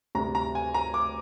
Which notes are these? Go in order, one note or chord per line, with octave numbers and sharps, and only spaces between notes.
D2 C3 G3 A#5
A#5
G#5
A#5
D6